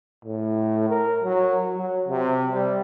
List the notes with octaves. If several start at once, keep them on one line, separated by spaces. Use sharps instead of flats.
A2
A#4
F#3
F#3
C3
G3